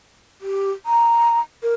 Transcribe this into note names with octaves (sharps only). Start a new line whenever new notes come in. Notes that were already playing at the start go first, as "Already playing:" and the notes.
G4
A#5
A#4